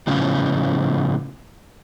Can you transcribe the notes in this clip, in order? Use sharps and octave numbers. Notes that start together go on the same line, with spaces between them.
A2 C#3 F3 C#4